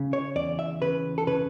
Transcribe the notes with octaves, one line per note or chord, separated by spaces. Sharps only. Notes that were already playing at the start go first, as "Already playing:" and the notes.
Already playing: C#3
C#5
E2 D5
E5
C#3 B4
A4
C#3 B4